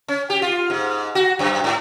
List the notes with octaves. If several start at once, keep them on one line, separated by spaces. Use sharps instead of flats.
C#4
G4
F4
G#2
F#4
F#2
G#2